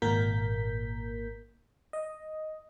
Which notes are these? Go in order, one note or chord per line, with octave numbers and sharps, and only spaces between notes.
G#1 A#2 A#3 A#4 G6 B6
D#5